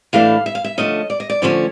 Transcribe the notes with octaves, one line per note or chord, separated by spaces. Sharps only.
A2 E3 A3 D4 F5
E5
F5
E5
D3 F3 A3 C#4 D#5
D5
D#5
D5
D3 F3 A3 C#4 C#5